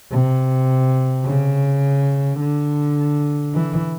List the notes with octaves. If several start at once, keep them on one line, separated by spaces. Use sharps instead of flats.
C3
C#3
D3
E3